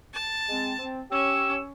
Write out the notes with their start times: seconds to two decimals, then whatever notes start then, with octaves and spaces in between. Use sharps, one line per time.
0.13 A5
0.49 G#3 C4
0.79 C4
1.11 C#4 G4 C#5 E6